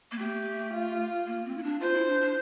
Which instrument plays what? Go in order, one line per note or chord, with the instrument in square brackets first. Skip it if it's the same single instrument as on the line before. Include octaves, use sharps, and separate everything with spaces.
[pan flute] A#3
[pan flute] A3 [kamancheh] G4
[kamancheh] F4
[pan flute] A#3
C4
E4
D4
[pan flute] F4 [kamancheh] C5
[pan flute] E4
D4
D4